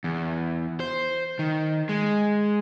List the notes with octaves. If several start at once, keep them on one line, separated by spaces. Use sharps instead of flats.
E2
C5
D#3
G#3